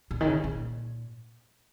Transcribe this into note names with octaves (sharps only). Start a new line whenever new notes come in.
A#2
D#3
C#3
A#2